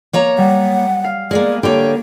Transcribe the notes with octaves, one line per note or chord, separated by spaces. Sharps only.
A#3 C#5 A#5
G3 F#5
F5
G#3 A#3 B3 G#4 D5
D3 G3 A#3 G4 C#5